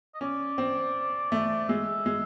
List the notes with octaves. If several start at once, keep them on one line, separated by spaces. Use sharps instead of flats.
D#5
C#4 D5
C4
A3
G#3 E5
G#3